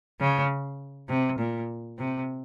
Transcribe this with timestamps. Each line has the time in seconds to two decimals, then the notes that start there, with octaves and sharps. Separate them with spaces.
0.20 C#3
1.09 C3
1.39 A#2
1.98 C3